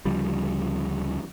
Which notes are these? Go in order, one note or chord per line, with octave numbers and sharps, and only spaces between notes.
D2 C#3 F3 G3